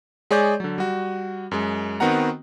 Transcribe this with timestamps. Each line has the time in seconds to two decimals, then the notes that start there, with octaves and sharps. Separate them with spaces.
0.31 G#3 G#4 C#5 D5 C#6 G6
0.60 D3 F#3
0.78 G3 F#4
1.51 F#2 G#3
2.00 D#3 B3 C4 F#4 F#5 A#5